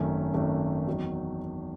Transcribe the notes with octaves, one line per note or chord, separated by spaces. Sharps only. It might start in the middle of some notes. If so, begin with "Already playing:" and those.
Already playing: G#1 F#2 D#3 A3 C#4
G#1 F#2 D#3 A3 C#4
E2 D#3 F#3